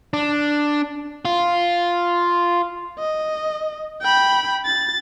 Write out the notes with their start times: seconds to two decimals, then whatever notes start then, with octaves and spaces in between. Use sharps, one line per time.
0.13 D4
1.25 F4
2.99 D#5
4.02 G5 B5
4.66 A6